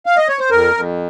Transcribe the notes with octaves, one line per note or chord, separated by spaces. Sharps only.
F5
D#5
C#5
C5
F2 A#4
F2